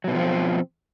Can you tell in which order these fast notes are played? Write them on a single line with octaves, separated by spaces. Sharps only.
F#3 B2 D3 F3 C4